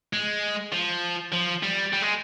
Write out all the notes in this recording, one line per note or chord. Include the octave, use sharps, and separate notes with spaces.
G#3
F3
F3
G3
G3
G#3